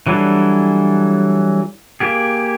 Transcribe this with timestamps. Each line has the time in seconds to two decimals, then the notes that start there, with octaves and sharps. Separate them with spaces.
0.07 E3 F#3 G3 D4 A4
2.00 A#3 G4 G#4